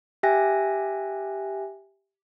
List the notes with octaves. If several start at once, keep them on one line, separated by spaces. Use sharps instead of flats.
G4 E5 G5 G#5 F#6 A#6